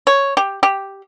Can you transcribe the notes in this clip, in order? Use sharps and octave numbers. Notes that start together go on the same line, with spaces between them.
C#5
G4
G4